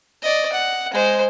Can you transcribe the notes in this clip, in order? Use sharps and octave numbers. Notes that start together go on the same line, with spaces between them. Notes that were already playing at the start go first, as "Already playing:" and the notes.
D5 D#5
F#5
G#3 C5